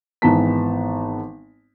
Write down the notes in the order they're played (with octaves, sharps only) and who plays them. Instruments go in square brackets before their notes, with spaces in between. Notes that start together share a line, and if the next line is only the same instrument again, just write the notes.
[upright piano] G#1 E3 B3 A5 A#5 B6